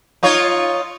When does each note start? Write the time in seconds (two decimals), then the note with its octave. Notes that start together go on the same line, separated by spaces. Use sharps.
0.23 D#4 F4 C#5